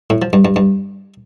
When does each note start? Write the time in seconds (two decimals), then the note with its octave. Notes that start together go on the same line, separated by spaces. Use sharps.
0.10 A2
0.22 F3
0.33 G2
0.45 G2
0.56 G2